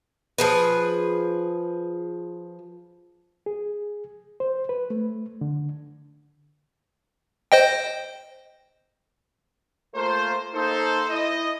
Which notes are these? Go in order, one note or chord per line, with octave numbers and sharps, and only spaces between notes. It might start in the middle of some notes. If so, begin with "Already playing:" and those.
F3 G#4 B4
G#4
C5
B4
A3
D3
C5 D#5 G5
A3 A#3 F4 A#4 C5
A#3 D#4 A4 C5
E4 D#5